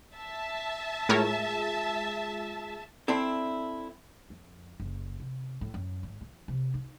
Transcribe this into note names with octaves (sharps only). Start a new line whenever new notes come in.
E5 A5
A2 G#3 F4 G#4 A#4 C#5
C4 D4 E4 A4
F2
F#1
C3
A2
F#2
G#1
E3
C3
D#4